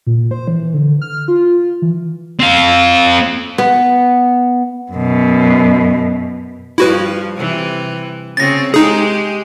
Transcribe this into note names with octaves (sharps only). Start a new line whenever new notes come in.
A#2
C5
E3
D3
F6
F4
E3
C4 F5
B3
F#2 B2
G2 F3 E4 F#4 B4
C3 E3
C#3 C4 A6 A#6
G#3 D#4 G4 G#4